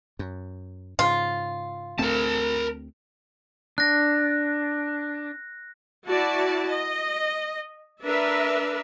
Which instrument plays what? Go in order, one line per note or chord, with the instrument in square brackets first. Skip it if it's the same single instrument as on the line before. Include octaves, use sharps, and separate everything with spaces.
[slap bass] F#2
[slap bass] G#2 C#3 [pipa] F4
[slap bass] D2 A3 C4 [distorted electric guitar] A#4 A5
[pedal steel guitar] D4 [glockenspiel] F#6 A#6
[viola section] E4 F#4 D5 A5
D#5
D4 A#4 B4 E5